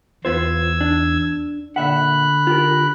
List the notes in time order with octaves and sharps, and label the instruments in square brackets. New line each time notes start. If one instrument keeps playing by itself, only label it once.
[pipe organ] E2 E6 G#6 [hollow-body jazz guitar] B3 F4 C5
[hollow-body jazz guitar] D4
[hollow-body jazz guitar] A#2 E5 F#5 [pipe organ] D3 B5 F#6
[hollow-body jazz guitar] F4 G4 A#4